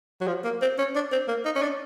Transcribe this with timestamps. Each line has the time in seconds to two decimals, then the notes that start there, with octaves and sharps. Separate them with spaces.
0.21 F#3
0.28 F3
0.44 A#3
0.61 C4
0.78 C#4
0.95 D4
1.12 C4
1.28 A#3
1.45 D#4
1.56 C#4
1.62 D4